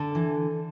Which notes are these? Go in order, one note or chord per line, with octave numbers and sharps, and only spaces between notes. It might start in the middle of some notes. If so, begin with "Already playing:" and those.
Already playing: D3 A4
E3